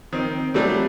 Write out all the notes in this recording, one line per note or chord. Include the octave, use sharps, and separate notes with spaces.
D#3 C4
F#3 G3 A3 C4